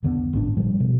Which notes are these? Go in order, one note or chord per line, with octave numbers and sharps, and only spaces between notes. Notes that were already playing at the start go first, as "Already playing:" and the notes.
C2 F2 D3 B3
G#1 A2 C#4 D4
A#2 F3 G3
B2